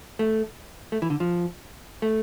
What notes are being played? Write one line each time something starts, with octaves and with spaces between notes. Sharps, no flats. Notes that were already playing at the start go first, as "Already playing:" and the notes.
A3
A3
E3
D3
F3
A3